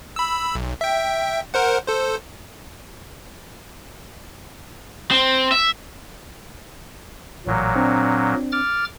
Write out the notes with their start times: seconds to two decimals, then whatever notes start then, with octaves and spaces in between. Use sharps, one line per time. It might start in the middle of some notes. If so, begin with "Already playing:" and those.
0.16 B5 E6
0.55 B1
0.81 E5 G5
1.54 A#4 C5 F#5
1.87 A4 C5
5.11 C4
5.52 E5
7.46 A1 A#2 F#3
7.76 C4 D4
8.52 D6 F6 A6